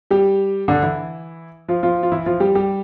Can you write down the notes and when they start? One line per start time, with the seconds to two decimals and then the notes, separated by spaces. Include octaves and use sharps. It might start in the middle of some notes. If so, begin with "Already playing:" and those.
0.11 G3 G4
0.68 D3 D4
0.82 E3 E4
1.68 F3 F4
1.83 F3 F4
2.03 F4
2.12 E3 E4
2.26 F3 F4
2.40 G3 G4
2.55 G3 G4